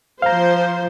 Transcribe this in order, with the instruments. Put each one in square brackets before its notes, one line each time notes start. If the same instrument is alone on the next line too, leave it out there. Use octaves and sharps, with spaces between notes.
[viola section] F3 C5 [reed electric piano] F5 A#5